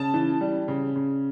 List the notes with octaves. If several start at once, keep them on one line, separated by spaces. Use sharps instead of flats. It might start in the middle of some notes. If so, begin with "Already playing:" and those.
Already playing: C#3 A5
E3
G3
C#3
C#3